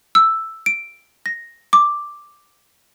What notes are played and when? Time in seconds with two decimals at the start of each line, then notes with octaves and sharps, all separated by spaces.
0.15 E6
0.66 D7
1.26 A#6
1.73 D6